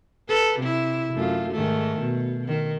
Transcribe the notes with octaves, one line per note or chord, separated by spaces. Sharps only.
A4 B4
C3 E4
F#2 A3 F4
G#2 D#3 A3
B2
D#3